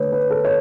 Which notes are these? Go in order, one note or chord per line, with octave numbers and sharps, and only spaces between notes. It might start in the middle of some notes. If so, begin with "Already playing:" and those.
Already playing: D3 A3 D4 B4 C#5
B4
A4
C#5